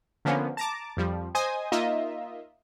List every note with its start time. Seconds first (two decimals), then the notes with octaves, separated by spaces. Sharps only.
0.25 D3 F3 A#3 B3 C#4
0.57 A5 A#5 D6
0.97 F2 F3 G3
1.35 C5 D#5 G#5 D#6
1.72 A#3 D#4 F4 D#5 E5